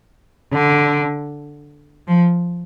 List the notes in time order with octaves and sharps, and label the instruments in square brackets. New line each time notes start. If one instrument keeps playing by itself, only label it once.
[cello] D3
F3